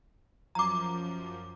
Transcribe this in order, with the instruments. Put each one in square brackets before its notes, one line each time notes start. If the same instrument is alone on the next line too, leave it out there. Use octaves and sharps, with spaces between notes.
[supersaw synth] F#2 F3 [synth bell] A#5 D6